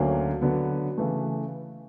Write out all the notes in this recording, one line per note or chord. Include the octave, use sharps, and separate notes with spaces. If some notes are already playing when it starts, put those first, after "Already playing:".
Already playing: D2 D3 F#3 A#3 C#4
D3 F#3 B3
C#3 E3 A3